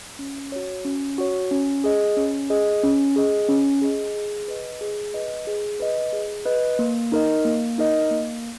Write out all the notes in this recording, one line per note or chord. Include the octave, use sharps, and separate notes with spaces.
C#4
F#4 C#5
C#4
F#4 C#5
C#4
G#4 D#5
C#4
G#4 D#5
C#4
G#4 D#5
C#4
G#4 D#5
G#4
B4 D#5
G#4
B4 D#5
G#4
B4 D#5
G#4
B4 D#5
A#3
D#4 A#4 D#5
A#3
D#4 A#4 D#5
A#3